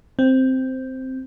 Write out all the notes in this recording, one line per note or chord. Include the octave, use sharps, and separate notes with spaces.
C4